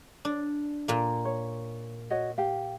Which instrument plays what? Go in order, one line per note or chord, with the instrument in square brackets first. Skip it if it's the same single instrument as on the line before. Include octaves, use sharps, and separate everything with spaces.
[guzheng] D4
A#2 A#3
[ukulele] C#5
F#4 C#5 D#5
G4 F5